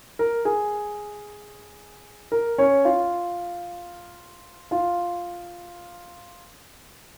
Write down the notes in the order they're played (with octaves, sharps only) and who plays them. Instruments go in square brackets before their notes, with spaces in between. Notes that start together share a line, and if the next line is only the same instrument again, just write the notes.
[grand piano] A#4
G#4
A#4
C#4 C#5
F4 F5
F4 F5